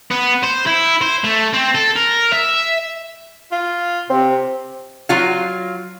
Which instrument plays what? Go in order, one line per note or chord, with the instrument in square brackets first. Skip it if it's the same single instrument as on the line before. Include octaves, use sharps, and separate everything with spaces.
[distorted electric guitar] B3
C5
E4
C5
A3
C4
A4
A#4
E5
[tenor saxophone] F4
[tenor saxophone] C3 [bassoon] C4
[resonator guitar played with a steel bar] F#3 F4 F5